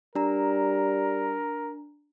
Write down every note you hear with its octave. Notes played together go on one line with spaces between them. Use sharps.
G3 D4 A#4 A#5